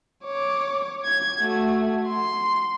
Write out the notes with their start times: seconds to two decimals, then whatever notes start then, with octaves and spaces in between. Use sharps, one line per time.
0.24 C#5 D6
1.05 G#6
1.40 A3 F#4
2.07 C6